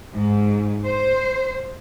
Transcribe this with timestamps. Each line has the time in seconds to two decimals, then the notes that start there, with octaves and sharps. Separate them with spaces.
0.13 G#2
0.84 C5